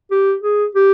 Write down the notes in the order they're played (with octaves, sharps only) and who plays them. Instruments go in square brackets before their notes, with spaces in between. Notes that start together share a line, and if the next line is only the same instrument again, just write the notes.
[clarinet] G4
G#4
G4